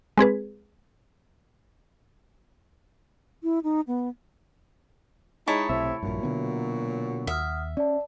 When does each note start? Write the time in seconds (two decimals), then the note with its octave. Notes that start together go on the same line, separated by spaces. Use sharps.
0.17 G#3 C4 G#4 B4
3.43 E4
3.64 D#4
3.87 B3
5.48 G#3 D#4 E4 C#5 A5
5.70 B1 A2 C3 C4 E5
6.03 A#1 G2 A#2 F#3
6.23 B2 D3 B3
7.27 D#2 E5 F#5 D#6 F6
7.77 C#4 D5 A5